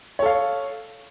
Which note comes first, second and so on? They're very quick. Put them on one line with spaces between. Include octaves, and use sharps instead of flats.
C#5 A4 F5